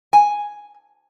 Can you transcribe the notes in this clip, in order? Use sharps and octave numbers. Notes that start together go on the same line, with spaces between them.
G#5